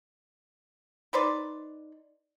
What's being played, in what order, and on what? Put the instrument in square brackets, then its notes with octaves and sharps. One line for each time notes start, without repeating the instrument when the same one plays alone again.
[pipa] D#4 B4 C5 D5